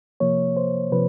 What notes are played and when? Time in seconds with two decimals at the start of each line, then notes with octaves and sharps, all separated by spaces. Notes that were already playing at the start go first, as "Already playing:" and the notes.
0.20 C3 F3 A#3 C#5
0.57 C5
0.92 C3 F3 B4